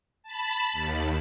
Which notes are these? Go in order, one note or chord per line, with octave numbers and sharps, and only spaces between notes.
A5 B5
D#2